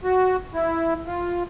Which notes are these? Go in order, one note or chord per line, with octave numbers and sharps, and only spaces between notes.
F#4
E4
F4